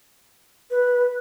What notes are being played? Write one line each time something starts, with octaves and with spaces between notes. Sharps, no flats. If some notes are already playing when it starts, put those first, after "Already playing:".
B4